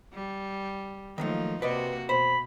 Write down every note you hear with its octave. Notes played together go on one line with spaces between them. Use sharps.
G3
D#3 F3 F#3 A3 A#3 D#4
C3 A#3 F#4 B4 D5 D#5
B2 C5 B5